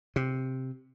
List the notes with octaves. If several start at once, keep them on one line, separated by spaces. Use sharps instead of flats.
C3